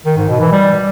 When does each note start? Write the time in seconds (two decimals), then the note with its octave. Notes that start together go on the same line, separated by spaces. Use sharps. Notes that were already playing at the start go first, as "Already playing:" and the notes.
0.06 D#3
0.17 G#2
0.29 B2
0.40 E3
0.52 G3